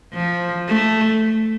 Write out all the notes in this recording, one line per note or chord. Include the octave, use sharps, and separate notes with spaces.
F3
A3